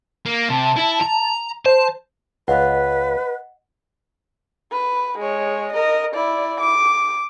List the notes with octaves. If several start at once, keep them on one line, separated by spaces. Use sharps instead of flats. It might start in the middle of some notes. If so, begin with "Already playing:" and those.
A#3
C3 A5
E4
A#5
C5 A5
C#2 B4 D#5 F#5
B4
G#3 C#5
A#4 D#5
E4 D5
D6